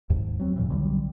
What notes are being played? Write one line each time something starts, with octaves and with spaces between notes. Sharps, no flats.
D#2 G#2
F#3 C4
E2 A#2 C#3 E3
B1 D3 F#3 G3